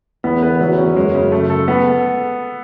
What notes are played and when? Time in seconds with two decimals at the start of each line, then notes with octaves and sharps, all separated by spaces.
0.24 E2 B3
0.43 B4
0.61 F#3
0.78 C#4
0.96 F#2 G#3
1.15 C#3
1.32 A3
1.50 A4
1.68 B3